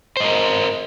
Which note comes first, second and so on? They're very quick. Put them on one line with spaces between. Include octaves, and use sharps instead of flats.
C5 D#5 A#4